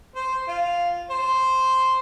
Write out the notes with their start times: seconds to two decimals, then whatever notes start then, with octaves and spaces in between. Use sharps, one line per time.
0.16 C5
0.48 F4
1.11 C5